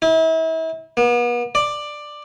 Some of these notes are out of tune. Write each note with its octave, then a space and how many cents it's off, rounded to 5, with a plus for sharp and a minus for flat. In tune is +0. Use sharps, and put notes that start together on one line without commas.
E4 -35
B3 -40
D5 +10